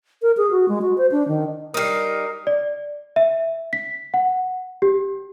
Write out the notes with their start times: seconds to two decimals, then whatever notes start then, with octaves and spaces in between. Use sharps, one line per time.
0.22 A#4
0.37 G#4
0.51 F#4
0.68 G#3
0.82 F#4
0.98 C5
1.12 D4
1.28 D#3
1.74 G3 D#4 A#4 D#6 F6 C7
2.47 D5
3.16 E5
3.73 B6
4.14 F#5
4.82 G4